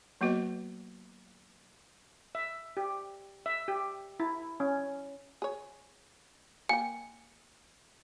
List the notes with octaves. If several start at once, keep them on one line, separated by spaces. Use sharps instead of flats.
F#3 A#3 B3 F#4 B4 D#5
E5
G4
E5
G4
E4
C#4
G#4 C#5
A#3 G5 G#5